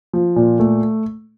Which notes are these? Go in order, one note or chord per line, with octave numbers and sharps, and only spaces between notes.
F3
A#2
A3